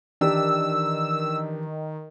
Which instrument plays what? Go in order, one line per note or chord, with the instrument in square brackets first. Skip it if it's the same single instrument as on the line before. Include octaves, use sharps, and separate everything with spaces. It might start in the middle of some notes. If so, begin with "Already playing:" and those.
[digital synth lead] D#3 [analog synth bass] E3 [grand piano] D4 G4 [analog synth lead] E6